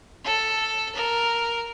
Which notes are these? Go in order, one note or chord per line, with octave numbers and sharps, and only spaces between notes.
A4
A#4